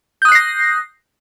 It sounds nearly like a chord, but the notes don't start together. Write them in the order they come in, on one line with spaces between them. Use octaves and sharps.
G6 D#6 F#6 C7 A#6